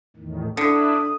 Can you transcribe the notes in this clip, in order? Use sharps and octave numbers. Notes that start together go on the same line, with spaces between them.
E2 A2 D#3
D3 D4 E4 D#6